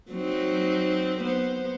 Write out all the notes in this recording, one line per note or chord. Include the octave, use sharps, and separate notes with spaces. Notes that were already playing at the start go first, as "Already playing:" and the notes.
F#3 C4 D#4
B3 C5